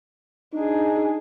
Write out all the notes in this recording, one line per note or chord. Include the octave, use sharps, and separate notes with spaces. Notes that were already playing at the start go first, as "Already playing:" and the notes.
D4 D#4 G#4